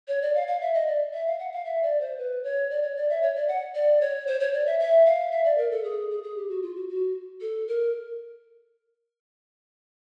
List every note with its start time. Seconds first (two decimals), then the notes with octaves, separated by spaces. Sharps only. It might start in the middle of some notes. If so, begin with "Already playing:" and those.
0.08 C#5
0.22 D5
0.35 F5
0.48 F5
0.61 E5
0.74 D#5
0.87 D5
1.13 E5
1.27 F5
1.39 F#5
1.53 F5
1.65 E5
1.83 D5
2.01 C5
2.18 B4
2.44 C#5
2.71 D5
2.83 C#5
2.96 D5
3.10 E5
3.23 C#5
3.36 D5
3.48 F#5
3.75 D5
4.01 C#5
4.27 C5
4.40 C#5
4.53 D5
4.66 E5
4.80 E5
5.06 F5
5.32 E5
5.45 D5
5.58 A#4
5.71 A4
5.84 G#4
6.11 G#4
6.23 G#4
6.37 G4
6.49 F#4
6.62 F4
6.75 F#4
6.89 F#4
7.41 A4
7.68 A#4